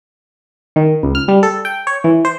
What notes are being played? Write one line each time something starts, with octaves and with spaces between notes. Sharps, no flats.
D#3
C#2
F6
G3
A4
G5
C#5
E3
C5